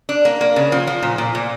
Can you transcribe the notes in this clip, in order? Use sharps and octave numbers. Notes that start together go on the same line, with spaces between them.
D4
A#3
A#3
C#3
F3
F3
A#2
A#2
A#2